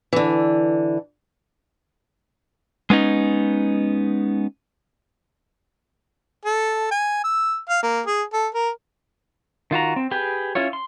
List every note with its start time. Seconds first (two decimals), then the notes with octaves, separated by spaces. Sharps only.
0.13 D3 E3
2.90 G#3 B3 C#4 D#4
6.45 A4
6.91 G#5
7.24 E6
7.69 F5
7.83 A#3
8.06 G#4
8.33 A4
8.54 A#4
9.71 D#3 F4 F#4 A#5
9.96 C4
10.11 G4 G#4 B4 G5
10.55 C#4 E4 F4 C#5
10.73 C6